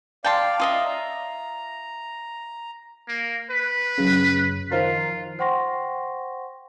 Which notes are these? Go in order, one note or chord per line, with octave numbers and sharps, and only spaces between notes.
D5 F5 G5 A5 C6
F4 D#5 E5
A#5
A#3
B4
F#2 C#3
D#3 F3 F4 A#4
C5 F#5 G5 C6 C#6 A#6